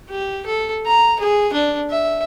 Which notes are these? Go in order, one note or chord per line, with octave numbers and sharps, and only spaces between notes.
G4
A4
A#5
G#4
D4
E5